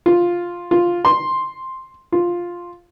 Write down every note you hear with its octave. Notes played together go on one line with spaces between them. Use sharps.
F4
F4
C6
F4